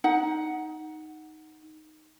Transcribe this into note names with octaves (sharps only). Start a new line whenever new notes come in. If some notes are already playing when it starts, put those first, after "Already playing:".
D#4 F#5